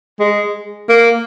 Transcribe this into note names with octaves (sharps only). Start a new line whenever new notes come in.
G#3
A#3